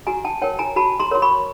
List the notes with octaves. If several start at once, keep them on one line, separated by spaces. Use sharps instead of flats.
F#4 G#5 A#5
G5 A5
A#4 C#5 G5 A5
G#5 A#5
F#4 A5 B5
A#5 C6
A#4 C#5 C6
B5 C#6